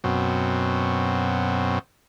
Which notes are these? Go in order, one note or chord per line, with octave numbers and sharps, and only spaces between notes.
F#2 B2 C4